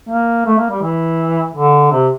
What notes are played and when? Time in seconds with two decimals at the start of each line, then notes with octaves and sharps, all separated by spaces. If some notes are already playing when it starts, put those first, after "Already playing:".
0.09 A#3
0.46 A3
0.58 A#3
0.70 G3
0.82 E3
1.55 D3
1.91 C3